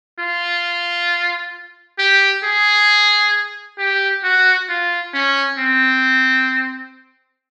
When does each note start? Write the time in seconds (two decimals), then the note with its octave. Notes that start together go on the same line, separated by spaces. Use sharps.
0.19 F4
1.99 G4
2.44 G#4
3.78 G4
4.24 F#4
4.69 F4
5.14 C#4
5.58 C4